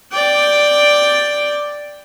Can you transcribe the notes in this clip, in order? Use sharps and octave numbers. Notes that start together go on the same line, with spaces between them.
D5 G5